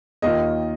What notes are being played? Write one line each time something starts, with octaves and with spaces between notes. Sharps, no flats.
D#2 D#3 A#3 F4 D#5